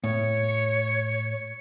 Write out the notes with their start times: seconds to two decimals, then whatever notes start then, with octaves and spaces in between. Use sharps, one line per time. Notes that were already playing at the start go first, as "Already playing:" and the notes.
0.04 A2 C#5 C#7